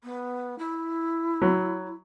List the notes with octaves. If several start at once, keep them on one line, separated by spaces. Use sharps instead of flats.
B3
E4
F#3